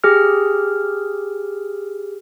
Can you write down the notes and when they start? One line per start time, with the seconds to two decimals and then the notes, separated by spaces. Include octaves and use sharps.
0.04 G4 G#4 F6